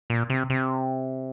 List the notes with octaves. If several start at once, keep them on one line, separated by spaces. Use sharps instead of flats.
A#2
C3
C3